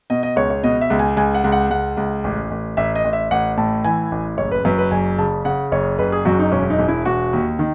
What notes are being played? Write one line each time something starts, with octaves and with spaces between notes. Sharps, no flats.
B2 D#5
D#5
C#2 C#5
C#5
B2 D#5
E5
C#2
G#5
C#2 G#5
F#5
C#2
F#5
C#2 F#5
C#2
A1
A1
A1 E5
D#5
A1
E5
A1 F#5
A2 A5
E3 G#5
A1
F#1 C#5
B4
F#2 B4
B4
F#1 G#5
C#3 A5
C#3 F#5
F#1 C#5
F#1 B4
G#4
F#2 F#4
D#4
E1 C#4
D#4
E1
E4
E1 F#4
D#2
D#3